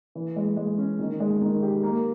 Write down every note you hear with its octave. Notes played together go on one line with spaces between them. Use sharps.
E3
G#3
G#3
C#4
D#3
G#3
D#3
G4
A#3